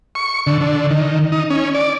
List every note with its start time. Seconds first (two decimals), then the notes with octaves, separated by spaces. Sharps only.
0.15 C#6
0.47 D3
0.61 D3
0.91 D#3
1.32 D#4
1.50 C#4
1.75 D5